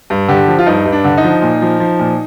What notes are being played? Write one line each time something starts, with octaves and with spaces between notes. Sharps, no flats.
G2
D3 G4
F3
F4
G2 D#4
G2
D4
D3
D#4
F3
A#2
F3
F3
A#2